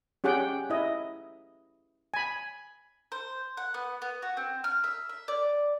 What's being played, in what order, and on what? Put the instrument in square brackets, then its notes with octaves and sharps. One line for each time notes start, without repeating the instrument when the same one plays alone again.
[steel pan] C#4 G4 G#4 F#5 G5
E4 D#5
G#5 B5
[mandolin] C5
F#5
B3
B3
F#4
C4
F6
E5
E5
D5